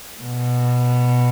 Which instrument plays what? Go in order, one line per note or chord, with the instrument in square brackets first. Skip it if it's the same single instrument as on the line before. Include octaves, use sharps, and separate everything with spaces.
[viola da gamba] B2